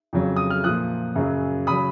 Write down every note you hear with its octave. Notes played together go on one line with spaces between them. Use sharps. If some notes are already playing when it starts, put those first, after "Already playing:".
F2 C#3 F#3
D#6
F6
A#2 F3 D#6 F#6
F#2 C#3 F#3
C#3 F#3 B5 D#6